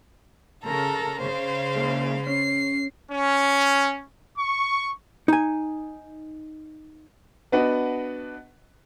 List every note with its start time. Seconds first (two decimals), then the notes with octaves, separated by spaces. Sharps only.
0.64 C#3 A4 A#4 A#5
1.21 C#3 C5 F5
1.75 A#2 G#3 A#3
2.27 C#4 C7
3.11 C#4
4.37 C#6
5.28 D#4 G#5
7.52 B3 D4 F#4 B4 D#5 F#5